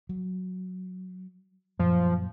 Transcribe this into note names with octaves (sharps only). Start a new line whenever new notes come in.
F#3
F#2 A#2 F3